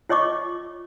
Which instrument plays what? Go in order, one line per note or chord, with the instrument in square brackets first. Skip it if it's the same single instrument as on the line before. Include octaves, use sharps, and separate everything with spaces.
[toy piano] F4 C#5 D#5 C#6 D6